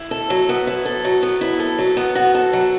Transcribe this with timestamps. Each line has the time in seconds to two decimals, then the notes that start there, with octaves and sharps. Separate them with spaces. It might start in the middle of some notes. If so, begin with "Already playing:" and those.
Already playing: E4
0.11 A4
0.30 F#3
0.49 B3
0.67 E4
0.85 A4
1.05 F#3
1.23 B3
1.41 E4
1.59 A4
1.78 F#3
1.97 B3
2.15 F#4
2.34 A4
2.53 F#3